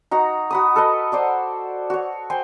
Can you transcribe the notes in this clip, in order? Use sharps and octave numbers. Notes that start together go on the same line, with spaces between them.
D#4 F#4 A#5
F#4 B5 D#6
A4 B4 D#5
C5 D5 F#5
F#4 C#5
C5 G5 G#5